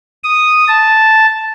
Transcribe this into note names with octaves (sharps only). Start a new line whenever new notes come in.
D#6
A5